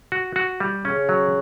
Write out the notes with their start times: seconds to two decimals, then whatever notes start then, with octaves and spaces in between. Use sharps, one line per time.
0.12 F#4
0.36 F#4
0.60 G3
0.84 C#3 C#4
1.09 F#3